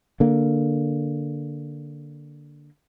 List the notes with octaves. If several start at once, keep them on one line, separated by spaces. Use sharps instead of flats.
D3 A#3